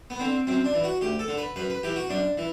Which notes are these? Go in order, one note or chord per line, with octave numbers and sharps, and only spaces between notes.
B3
D3 C4
F#2 C4
D4
E3
F#4
D2 G4
A4
D3
B4
F#2 B4
B4
E3 G4
F#4
F#2 D4
E3